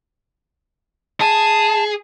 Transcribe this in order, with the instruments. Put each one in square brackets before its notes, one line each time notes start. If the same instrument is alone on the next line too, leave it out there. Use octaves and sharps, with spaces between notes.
[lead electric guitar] G#4 [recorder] A5